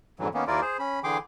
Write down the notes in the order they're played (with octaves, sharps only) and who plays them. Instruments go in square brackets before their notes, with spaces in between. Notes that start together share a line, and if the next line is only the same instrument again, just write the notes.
[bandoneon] F2 G#2 D3 E3 F#3
D#3 A#3 B3 C#4
D#2 A#3 E4 F4 A#4 D5
G#4 C5
C#4 B5
D3 E3 G#4 G5 C6 D6